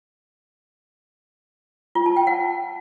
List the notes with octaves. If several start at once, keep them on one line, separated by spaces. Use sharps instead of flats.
F4
A5
G5
F#5